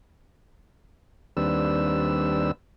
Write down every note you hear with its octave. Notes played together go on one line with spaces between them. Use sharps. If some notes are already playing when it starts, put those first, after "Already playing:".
D#2 G3 C4 D4 B4 E6